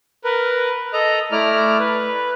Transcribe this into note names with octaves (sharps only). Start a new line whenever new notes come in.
A#4 B4
A4 D#5 A#5
A3 E4 D5 A#5 F6
B4